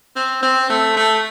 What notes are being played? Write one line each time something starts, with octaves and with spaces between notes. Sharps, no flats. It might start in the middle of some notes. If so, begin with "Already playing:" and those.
C4
C4
A3
A3